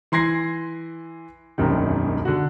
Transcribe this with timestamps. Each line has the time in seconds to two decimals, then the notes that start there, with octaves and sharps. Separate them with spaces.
0.12 E3 C6 G#6 A#6 C7
1.58 E1 C2 F#2 C3 D#3
2.25 D3 F#4